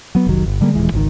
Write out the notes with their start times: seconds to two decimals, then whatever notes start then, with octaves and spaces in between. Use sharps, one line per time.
0.15 F#3 B3
0.27 F1 C2 D#3 F#3
0.46 G1
0.61 D3 G3 G#3 A#3
0.74 D#1 C#2 E3 G#3
0.92 G#1 C#2 B2 D#3